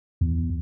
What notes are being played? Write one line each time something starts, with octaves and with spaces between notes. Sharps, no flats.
E2